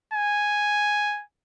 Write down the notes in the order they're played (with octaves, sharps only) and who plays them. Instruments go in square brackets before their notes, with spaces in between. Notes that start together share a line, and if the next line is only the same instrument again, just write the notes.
[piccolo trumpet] G#5